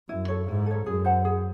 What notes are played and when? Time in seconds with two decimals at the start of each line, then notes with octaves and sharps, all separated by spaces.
0.09 F#2 E4
0.28 A4 C#5
0.48 G#2 E4
0.66 A4 C#5
0.85 F#2 G#4
1.05 C5 F#5 A5
1.25 G#4